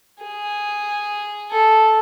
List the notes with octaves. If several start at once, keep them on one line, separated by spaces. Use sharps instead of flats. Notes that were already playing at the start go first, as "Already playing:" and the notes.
G#4
A4